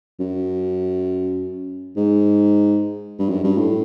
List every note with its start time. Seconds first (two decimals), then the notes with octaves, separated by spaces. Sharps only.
0.20 F#2
1.97 G#2
3.19 G2
3.29 F#2
3.44 G2
3.58 A2